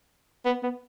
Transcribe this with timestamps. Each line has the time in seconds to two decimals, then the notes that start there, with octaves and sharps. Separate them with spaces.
0.45 B3
0.63 B3